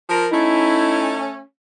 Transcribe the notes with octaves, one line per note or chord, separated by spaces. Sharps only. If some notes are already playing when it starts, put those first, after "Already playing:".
F3 A#4
A3 C#4 D#4 E4